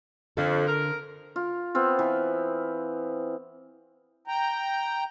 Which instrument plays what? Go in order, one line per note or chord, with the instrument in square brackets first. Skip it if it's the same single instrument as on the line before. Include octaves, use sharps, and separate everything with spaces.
[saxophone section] F2 [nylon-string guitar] D3 A4
[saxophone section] A#4
[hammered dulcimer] F4
B3 C4 F4
E3
[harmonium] G5 A#5